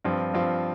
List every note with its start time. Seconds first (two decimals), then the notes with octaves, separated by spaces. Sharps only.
0.05 G2 F3 C4 F4
0.34 G2 F3 C4 F4